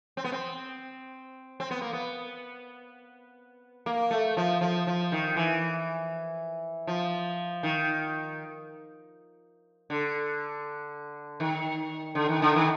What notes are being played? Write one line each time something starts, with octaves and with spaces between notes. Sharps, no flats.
C4
B3
C4
C4
B3
A#3
B3
A#3
A3
F3
F3
F3
D#3
E3
F3
D#3
D3
D#3
D3
D#3
D3
D#3